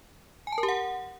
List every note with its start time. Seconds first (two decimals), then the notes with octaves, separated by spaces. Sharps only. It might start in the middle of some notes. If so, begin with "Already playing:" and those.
0.47 G#5
0.52 A5
0.58 A#4
0.63 G4
0.68 F#5